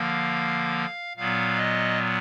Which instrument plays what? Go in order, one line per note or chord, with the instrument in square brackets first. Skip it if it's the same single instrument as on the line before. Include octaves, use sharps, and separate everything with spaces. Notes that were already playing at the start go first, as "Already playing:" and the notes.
Already playing: [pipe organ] D3 F3 A#3 F5
A#2 F#3 B3 F5
D#5